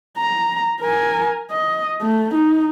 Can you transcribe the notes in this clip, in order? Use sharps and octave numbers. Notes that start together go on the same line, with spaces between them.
A#5
A#4 G#5
D#5
A3
D#4